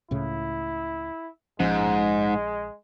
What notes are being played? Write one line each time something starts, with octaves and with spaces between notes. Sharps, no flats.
C#2 A2 C#3 E4
A#1 G#2 F3 G#3 C#4